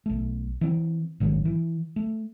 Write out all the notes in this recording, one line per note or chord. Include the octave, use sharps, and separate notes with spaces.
B1 A3
E3 C4
A1 G#2 D#3 F#3
E3
A3